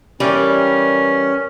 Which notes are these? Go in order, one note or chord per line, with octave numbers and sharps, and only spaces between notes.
E3 G3 C#4 A#4 D5